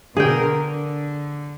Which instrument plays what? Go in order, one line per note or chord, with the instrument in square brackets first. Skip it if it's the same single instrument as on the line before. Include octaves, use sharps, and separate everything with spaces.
[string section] B2 D3 A#4 [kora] G#4 G5
[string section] D3